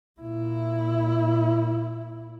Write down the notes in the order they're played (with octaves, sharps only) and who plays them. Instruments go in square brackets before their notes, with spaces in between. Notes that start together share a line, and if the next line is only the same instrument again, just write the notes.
[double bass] A#2 E4